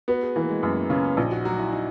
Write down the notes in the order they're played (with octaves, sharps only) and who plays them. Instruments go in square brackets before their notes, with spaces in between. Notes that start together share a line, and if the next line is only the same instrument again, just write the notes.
[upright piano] B3 [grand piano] F#4
[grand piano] G#4
[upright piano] E3 [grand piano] A#3
[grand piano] G#3
[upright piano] F#2 [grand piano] A#3
[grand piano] B3
[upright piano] C#3 [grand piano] C#4
[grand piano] C#4
[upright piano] A#1 [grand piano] D#4
[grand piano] F#4
[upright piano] F#3 [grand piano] F#4
[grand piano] E4
D#4